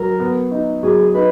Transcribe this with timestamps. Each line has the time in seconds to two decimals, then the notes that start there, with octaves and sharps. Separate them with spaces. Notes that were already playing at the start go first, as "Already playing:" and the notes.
Already playing: F#3 A#4
0.20 B3
0.51 D#4
0.83 F#3 G#4
1.14 D#4 B4